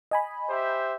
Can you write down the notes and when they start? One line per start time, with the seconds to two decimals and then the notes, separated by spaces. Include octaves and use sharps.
0.11 D#5 G#5 B5
0.50 G4 C5 E5